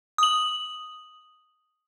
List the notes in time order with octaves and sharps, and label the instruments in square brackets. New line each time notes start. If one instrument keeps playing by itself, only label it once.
[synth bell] D#6 F#7